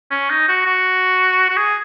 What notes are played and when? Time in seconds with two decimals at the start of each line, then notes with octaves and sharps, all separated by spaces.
0.11 C#4
0.30 D#4
0.48 F#4
0.66 F#4
1.50 F#4
1.57 G#4